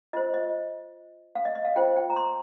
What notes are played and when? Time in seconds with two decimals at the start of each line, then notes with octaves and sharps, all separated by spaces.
0.13 F4 C5 D#5
0.34 D#5
1.35 F5
1.45 D#5
1.55 D#5
1.65 F5
1.76 F4 C5 G5
1.96 G5
2.10 A#5
2.16 C6